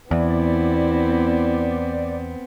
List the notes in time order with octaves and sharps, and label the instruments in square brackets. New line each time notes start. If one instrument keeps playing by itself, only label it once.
[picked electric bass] E2 [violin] B3 C4 [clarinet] E4 [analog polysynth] D5